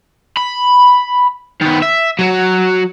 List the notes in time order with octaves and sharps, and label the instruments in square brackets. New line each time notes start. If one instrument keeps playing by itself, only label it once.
[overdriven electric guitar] B5
D#3 B3
E5
F#3 F#4